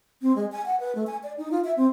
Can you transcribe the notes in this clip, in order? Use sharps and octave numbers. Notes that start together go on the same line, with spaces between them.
C4
G#3
G#5
F#5
B4
A3
G#5
D5
D#4
F4
E5
C4